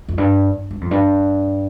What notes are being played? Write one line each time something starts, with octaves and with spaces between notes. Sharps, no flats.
F2
G2
G2
F2
G2